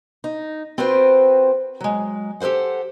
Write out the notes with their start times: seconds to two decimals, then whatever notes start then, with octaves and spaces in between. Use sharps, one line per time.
0.24 D#4
0.78 C4 F4 F#4 B4 C5 G5
1.81 F#3 G#3
2.40 G4 A4 B4 C5 F#5